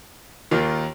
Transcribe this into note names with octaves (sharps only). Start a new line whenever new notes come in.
D#2 D#3 A#3 F4